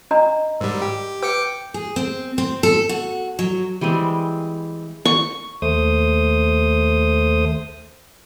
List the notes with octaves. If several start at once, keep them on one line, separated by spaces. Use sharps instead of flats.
D4 D#5 A#5
G#2 G3 A#4
G4
B4 G5 D6 C#7
G#4
C4
C4
A4
F#4
F#3
E3 G3 G#3 C4
C#6
D#2 A3 C5 D#6